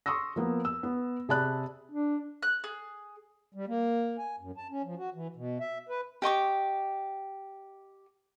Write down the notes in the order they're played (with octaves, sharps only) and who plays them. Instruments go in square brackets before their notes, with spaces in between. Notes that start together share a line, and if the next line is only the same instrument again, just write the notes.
[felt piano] C6 C#6 D#6 E6 A#6
F3 A#3 B3
E6
B3
C3 G#4 D5 A5 B5 F#6
[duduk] D4
[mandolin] F#6
G#4
[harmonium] G3
A#3
G#5
F#2
A5
C#4
F3
F#4
E3
B2
E5
B4
[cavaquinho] G4 D#5 C#6 D6